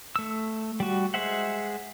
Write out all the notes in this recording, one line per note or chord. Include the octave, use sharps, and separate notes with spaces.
A3 E6
G3 F#4
G#3 G#4 C5 E5 F#5